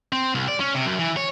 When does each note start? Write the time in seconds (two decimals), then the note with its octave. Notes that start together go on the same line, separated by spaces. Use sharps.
0.12 C4
0.35 C2
0.48 D5
0.60 C#4
0.74 C3
0.86 F#2
0.99 E3
1.17 C#5